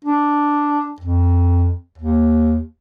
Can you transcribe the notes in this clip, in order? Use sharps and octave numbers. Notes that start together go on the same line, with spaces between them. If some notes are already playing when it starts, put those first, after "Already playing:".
D4
F2
D#2